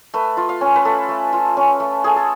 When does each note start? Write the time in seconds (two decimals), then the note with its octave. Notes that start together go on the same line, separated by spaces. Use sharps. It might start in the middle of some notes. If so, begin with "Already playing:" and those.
0.14 A3 B4
0.37 F4
0.49 F5
0.61 C#4
0.76 B4
0.85 A3 A4
1.09 A3
1.33 F4
1.57 C#4
1.80 A3
2.04 A3 G#4
2.16 A4